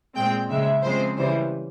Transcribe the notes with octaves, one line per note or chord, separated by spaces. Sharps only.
A#2 G#3 C4 G5
C#3 F3 G#3 E5
C#3 F3 G#3 C4 C5
C#3 E3 G3 C5